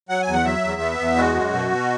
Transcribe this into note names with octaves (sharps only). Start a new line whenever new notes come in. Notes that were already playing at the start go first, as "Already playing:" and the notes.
F#3 F#5
G#5
E2
F#5
F#3 E5
E2
B3
E2
G#3 F#4
F#2
B2
B2